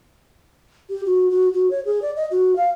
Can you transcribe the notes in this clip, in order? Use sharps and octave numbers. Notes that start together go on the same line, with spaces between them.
G4
F#4
F#4
F#4
C#5
G#4
D5
D#5
F#4
F5